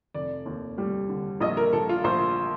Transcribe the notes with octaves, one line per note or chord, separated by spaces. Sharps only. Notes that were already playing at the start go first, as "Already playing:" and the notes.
F1 D5
D#2
G3
D3
A#1 D#5
A#4
A#1 A4
F4
A#1 C5